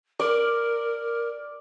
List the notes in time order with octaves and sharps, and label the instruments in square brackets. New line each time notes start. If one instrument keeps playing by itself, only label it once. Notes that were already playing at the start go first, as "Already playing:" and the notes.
[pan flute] A#4 [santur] D5